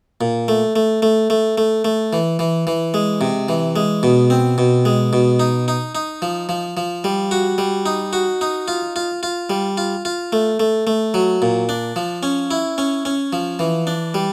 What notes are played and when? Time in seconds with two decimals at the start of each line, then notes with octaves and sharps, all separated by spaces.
0.21 A#2
0.48 A3
0.76 A3
1.02 A3
1.30 A3
1.58 A3
1.85 A3
2.13 E3
2.39 E3
2.67 E3
2.94 G#3
3.21 C3
3.49 E3
3.76 G#3
4.03 B2
4.30 C4
4.58 B2
4.85 G#3
5.13 B2
5.40 D#4
5.68 D#4
5.95 D#4
6.22 F3
6.49 F3
6.77 F3
7.04 G3
7.31 F#4
7.58 G3
7.86 D#4
8.13 F#4
8.41 D#4
8.68 F4
8.96 F4
9.23 F4
9.50 G3
9.77 F4
10.05 F4
10.33 A3
10.60 A3
10.87 A3
11.14 F#3
11.42 A#2
11.69 D4
11.96 F3
12.23 C#4
12.51 E4
12.78 C#4
13.05 C#4
13.33 F3
13.59 E3
13.87 D4
14.14 G3